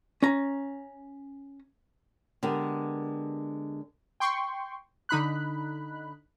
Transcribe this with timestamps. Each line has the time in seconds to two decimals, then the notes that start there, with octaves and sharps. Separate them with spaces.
0.22 C#4 A#5
2.43 D3 G#3 B3 G4 A#4
4.20 G5 C6 C#6
5.09 D3 D#4 B5 F#6